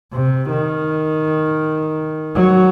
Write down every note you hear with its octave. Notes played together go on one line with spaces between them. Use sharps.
C3
D#3
F#3